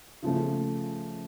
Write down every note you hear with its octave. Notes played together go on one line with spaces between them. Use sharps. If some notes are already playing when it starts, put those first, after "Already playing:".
C#3 F3 A3